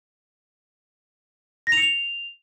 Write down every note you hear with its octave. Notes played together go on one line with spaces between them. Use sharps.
A#6
F7
C#7
F7